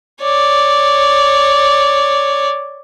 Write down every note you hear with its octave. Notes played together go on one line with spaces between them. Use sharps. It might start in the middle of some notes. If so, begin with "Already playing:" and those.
C#5 D5